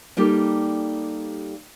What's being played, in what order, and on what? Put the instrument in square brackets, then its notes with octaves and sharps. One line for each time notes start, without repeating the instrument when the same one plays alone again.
[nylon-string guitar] G3 A#3 D#4 G4 A4